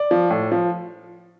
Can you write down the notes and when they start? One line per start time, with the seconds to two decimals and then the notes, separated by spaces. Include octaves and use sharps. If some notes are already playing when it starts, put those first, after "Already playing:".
Already playing: D5
0.11 F3
0.30 A2
0.52 F3